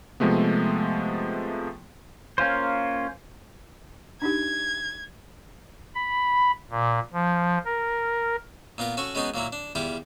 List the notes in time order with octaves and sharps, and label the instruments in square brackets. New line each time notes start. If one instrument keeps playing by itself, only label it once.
[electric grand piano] C3 F3 G#3 A3 B3
[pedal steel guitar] A#3 C#4 F4 C5
[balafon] D4 D#4 G4 [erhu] G#6
[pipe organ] B5
A#2
F3
A#4
[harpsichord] A#2 B3 F4 A#4
C#4 F#4 A4 C#6
G#3 B3 C#4 D#4 F#4 G#4
A#2 F#3 A#3 E4
D4
E2 G3 E4 F4 D6